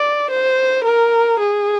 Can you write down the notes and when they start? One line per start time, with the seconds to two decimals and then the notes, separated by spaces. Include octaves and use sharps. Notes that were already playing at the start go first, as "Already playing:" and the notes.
Already playing: D5
0.30 C5
0.84 A#4
1.40 G#4